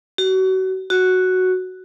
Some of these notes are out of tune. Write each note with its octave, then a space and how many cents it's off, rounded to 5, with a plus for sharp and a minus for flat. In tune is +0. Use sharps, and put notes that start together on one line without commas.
F#4 +30
F#4 +0